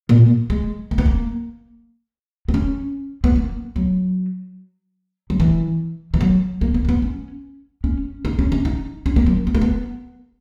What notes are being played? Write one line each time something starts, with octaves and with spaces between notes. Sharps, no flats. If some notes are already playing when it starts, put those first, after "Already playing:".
A#2
G#3
A#3
B3
A#3
B3
C#4
B3
A#3
F#3
F#3
E3
E3
F#3
A#3
B3
A#3
B3
C#4
C#4
D#4
C#4
C#4
D#4
C#4
A#3
F#3
B3
A#3
B3